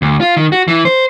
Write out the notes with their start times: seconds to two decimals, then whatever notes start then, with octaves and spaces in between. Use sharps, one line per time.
0.02 D2
0.21 F4
0.37 D#3
0.52 F#4
0.68 E3
0.85 C5